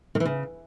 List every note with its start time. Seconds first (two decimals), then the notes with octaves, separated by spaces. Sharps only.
0.15 D#3
0.20 E3
0.25 C#3